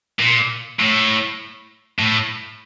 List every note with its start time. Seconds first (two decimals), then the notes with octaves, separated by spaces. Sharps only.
0.20 A#2
0.80 A2
1.99 A2